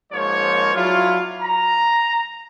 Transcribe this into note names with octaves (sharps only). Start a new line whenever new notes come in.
G#2 F3 A#3 C#5
F#3 D4 E4 F4
A#5